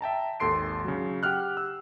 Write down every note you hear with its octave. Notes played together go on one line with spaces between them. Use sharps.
E5 G5 A5 A#5
G#1 D#2 A4 C6 C7 D7
C#3 F#3
G4 F#5 G5 F6 F#6
E6